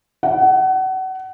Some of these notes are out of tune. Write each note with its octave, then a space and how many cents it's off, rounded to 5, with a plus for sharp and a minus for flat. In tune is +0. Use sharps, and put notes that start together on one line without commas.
F#5 +30